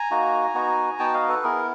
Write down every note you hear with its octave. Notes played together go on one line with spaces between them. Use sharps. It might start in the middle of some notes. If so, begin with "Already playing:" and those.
Already playing: G#5 A#5
A#3 D#4 F#4
B3 D#4 F#4
B3 D#4 F#4 G5 A5
D#5 F5
A4 B4
B3 E4 G#4 A#4